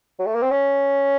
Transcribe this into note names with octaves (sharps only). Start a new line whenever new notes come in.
F#3
A3
A#3
C4
C#4